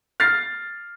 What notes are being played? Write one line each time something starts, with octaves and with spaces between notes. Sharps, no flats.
F6 A6 C7